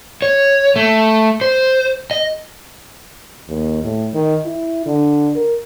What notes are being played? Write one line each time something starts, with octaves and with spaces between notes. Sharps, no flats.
C#5
A3
C5
D#5
D#2
A2
D#3
E4
D3
A#4